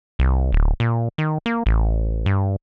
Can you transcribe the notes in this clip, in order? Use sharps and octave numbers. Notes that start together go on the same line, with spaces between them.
C2
D1
A#2
D#3
A#3
A1
G2